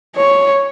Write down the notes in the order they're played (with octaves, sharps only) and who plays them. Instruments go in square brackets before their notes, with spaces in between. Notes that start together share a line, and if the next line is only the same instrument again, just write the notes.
[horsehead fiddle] C#5